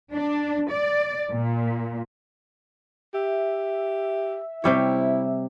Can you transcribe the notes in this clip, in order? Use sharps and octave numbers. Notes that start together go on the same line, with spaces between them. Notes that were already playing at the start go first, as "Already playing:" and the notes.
D4
D5
A#2
G4 E5
C3 G3 E4 C#5